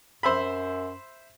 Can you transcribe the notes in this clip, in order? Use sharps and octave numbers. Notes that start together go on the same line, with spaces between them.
F#2 C5 E5 B5